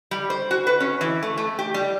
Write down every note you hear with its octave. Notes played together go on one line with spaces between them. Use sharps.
G3
C5
F#4
B4
C#4
E3
A3
A3
G4
G3